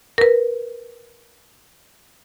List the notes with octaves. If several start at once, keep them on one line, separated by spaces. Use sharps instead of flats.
A#4 B4